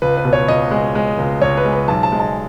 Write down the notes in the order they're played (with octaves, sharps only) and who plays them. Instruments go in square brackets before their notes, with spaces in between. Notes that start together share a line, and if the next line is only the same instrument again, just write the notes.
[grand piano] C#2 B4
B4
B2
C#5
C#2 D#5
G#3
G#3
C#2
C#2 C#5
B4
G#3
B4
B1 A5
A5
G#3
A5